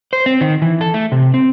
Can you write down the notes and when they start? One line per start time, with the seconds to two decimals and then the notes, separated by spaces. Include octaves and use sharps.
0.13 C5
0.26 C4
0.41 D#3
0.62 E3
0.81 A4
0.94 A3
1.12 C3
1.34 C4